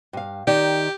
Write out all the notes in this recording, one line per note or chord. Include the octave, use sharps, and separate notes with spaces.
G2 F5
D#3 D#4 G4 D5